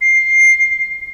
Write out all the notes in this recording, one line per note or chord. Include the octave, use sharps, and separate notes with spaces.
C7